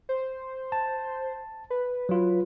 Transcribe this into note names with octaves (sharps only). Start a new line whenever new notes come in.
C5
A5
B4
F#3 F4